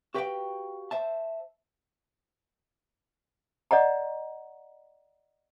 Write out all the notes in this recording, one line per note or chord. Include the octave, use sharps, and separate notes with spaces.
F#4 G4 B4 D#5 F5 G5
C5 E5 A5
D5 D#5 F#5 A#5